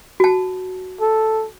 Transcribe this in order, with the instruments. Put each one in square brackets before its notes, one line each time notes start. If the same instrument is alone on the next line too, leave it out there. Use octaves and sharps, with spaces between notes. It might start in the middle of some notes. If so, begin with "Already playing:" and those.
[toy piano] F#4 A5
[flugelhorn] A4